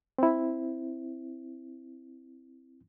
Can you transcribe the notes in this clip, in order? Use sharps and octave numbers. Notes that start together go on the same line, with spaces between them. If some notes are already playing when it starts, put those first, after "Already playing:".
C4 E4